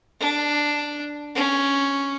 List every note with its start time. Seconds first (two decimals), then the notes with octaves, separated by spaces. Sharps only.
0.21 D4
1.36 C#4